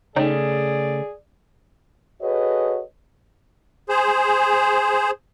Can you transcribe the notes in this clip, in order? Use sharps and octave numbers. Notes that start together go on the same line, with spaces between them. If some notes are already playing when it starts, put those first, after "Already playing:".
C#3 A3 D#4 G#4 C#5 D5 G5
F#4 G#4 A4 B4 C#5 D#5
G#4 C5